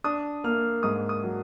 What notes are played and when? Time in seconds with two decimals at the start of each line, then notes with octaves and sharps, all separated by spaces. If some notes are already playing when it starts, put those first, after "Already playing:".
0.04 D4 D#6
0.44 A#3 F6
0.83 G#2 D#6
1.09 D#6
1.23 F#3